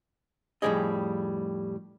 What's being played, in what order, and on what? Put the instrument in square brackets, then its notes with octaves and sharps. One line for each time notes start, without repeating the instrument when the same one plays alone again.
[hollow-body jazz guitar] F2 A2 D#3 G3 G#4 D#5